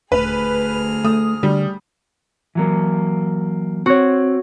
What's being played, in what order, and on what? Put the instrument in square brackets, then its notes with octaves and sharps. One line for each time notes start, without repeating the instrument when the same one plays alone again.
[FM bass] D#1 [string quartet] D2 G#4 F6 [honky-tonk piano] B4
[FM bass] A3 [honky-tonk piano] D#6
[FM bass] D3 [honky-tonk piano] G3
[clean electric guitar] E3 F#3 A#3
[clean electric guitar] C4 [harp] F#4 C#5